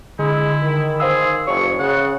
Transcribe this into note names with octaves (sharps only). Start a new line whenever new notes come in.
D3 G#3 E4
D#3
G#4 C5 F5 E6
F#1 C#5 C#6
C#3 F#5